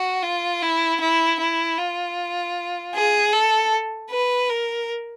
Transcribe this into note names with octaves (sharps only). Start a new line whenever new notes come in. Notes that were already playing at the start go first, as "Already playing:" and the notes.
Already playing: F#4
F4
E4
E4
E4
F4
G#4
A4
B4
A#4